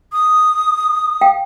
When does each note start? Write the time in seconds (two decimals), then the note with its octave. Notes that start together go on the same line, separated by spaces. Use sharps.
0.13 D#6
1.21 F5 G5